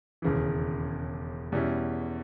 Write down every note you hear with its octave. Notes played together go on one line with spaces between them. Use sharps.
E1 D#2 C#3 E3
E2 B2 G3 C#4 E4